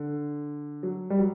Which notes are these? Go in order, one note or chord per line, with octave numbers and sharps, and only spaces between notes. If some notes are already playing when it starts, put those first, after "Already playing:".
Already playing: D3
F#3
G3
F#3